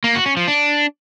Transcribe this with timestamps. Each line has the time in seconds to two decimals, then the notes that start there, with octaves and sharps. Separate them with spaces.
0.04 A#3
0.15 F#4
0.26 C#4
0.37 F3
0.48 D4